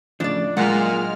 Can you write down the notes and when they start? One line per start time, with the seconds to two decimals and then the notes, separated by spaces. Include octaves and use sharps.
0.20 A2 C#3 F3 D4 D5
0.57 A#2 F#3 G#3 A#3 F#5 A#5 F6